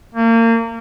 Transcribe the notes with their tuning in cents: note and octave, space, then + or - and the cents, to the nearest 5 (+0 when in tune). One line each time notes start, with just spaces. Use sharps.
A#3 -30